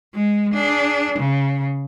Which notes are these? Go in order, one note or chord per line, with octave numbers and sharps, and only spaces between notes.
G#3
D4 G#4
C#3